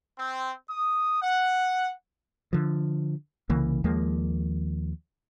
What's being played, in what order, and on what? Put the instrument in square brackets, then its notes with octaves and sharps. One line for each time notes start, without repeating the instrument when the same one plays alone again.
[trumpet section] C4
D#6
F#5
[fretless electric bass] D3 F3
C2 C#3 E3 A#3
D#2 F3 G#3 A#3